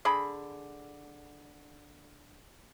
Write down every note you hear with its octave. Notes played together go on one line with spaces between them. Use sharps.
D3 G#4 B5